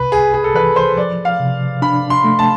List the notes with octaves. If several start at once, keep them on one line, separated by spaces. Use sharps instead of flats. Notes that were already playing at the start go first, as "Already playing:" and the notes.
Already playing: C2 C3 B4
C2 G#4
G#4
A4
E3 B4
C5
F3 D5
F5
C3
D4 B5
C6
A3
A5